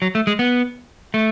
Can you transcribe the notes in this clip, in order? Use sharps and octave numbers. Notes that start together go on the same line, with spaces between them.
F#3
A3
G#3
B3
A3